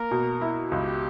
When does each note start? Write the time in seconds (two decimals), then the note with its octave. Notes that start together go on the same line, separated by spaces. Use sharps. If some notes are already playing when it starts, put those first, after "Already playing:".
Already playing: A#3 A#4
0.11 B2
0.41 E4
0.72 C#2 G4